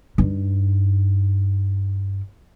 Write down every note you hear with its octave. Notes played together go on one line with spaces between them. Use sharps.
G2 D#4